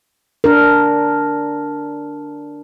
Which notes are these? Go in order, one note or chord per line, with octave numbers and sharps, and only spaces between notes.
D4 A#4